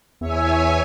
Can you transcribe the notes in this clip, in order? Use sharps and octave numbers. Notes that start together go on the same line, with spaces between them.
E2 C#5 E5 G#5